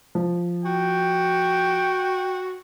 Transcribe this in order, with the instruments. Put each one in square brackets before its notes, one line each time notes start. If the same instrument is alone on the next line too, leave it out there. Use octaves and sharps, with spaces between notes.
[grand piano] F3
[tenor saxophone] F#4 [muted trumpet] G5